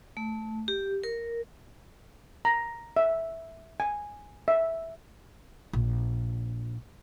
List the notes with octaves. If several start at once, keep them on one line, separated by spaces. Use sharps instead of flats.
A3
G4
A#4
A#5
E5
G#5
E5
A#1